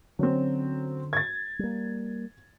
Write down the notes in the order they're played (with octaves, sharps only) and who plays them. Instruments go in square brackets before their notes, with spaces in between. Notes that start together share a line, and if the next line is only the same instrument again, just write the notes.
[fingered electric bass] D3 C#4 [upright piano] F#3 C4
[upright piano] G#6 A6
[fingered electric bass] G3 A#3